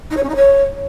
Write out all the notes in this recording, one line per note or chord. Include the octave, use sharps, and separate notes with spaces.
D#4
C#5
C#4
D#4
C#5